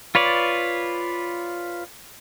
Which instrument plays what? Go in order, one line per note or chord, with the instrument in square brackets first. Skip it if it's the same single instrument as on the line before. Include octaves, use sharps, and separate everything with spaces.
[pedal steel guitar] F4 B4 C#5 D5